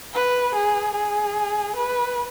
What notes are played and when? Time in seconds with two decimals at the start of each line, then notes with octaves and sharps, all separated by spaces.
0.14 B4
0.54 G#4
0.95 G#4
1.76 B4